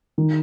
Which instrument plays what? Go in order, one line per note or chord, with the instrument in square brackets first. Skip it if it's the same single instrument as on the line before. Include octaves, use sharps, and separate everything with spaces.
[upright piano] D#3